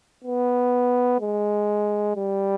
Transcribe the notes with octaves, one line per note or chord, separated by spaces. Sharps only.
B3
G#3
G3